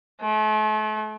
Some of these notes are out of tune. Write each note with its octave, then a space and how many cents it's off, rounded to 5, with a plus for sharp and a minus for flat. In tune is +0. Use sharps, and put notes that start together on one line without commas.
A3 -40